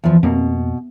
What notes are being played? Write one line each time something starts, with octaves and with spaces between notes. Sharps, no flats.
E2 F3
F2 B2 A#3 C4